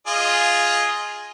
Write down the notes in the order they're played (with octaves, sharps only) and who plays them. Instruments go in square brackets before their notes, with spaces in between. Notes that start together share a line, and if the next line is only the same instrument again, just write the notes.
[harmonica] F4 G#4 D#5